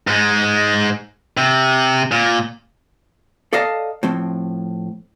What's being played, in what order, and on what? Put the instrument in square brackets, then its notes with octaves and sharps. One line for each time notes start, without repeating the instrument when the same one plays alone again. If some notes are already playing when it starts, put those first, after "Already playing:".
[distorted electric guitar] G#2 G#3
C3
A#2
[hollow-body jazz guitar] A4 D5 D#5 F5 A5 A#5
A2 F3 C4